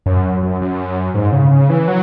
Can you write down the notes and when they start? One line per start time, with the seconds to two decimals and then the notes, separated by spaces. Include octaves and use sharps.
0.06 F#2
0.43 F#2
0.61 F#2
1.14 G#2
1.32 C#3
1.51 C#3
1.69 E3
1.88 F#3